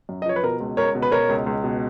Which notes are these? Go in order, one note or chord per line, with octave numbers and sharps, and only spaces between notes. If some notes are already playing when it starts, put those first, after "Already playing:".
F#2
D#5
F3 C#5
B4
B2 A#4
C#2
C#2 A#4 C#5
B2
B4
B2 A#4 C#5
C#2
C#2
B2